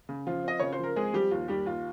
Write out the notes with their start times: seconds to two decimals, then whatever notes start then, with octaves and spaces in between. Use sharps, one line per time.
0.09 C#3
0.27 F3 F4
0.44 C4 D#5
0.60 C#3 C#5
0.73 C5
0.79 F3 A#4
0.96 G#3 C4 G#4
1.13 F3 G3 G4
1.31 D#2 F4
1.48 D#2 G3 G4
1.66 D#2 F4